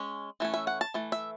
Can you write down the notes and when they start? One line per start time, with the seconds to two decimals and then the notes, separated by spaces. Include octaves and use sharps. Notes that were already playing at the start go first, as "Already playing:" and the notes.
Already playing: G#3 C#4
0.40 E3 A3 C#4
0.54 E5
0.67 F#5
0.81 A5
0.94 E3 A3
1.12 E5